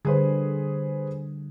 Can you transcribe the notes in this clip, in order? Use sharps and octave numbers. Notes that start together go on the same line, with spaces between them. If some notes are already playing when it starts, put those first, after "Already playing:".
D3 G3 G#4 B4 C5